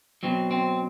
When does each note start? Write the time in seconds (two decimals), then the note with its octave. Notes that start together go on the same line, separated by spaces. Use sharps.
0.23 B2 F#3 C4
0.51 C4